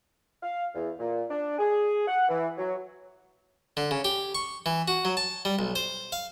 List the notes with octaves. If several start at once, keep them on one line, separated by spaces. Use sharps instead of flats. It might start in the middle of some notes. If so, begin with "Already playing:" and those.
F5
E2
A#2
D4
G#4
F#5
E3
F#3
D3
C#3
G4
C#6
E3
F#4
F#3
A5
G3
B1
C5
F5